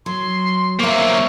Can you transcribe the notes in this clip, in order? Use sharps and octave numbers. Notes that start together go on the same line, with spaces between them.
F#3 C6
F#3 A#3 C5 E5 C#6